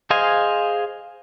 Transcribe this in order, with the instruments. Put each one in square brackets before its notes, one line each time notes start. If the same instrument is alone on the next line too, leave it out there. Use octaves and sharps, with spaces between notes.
[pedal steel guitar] G#4 C5 D#5 F5 G#5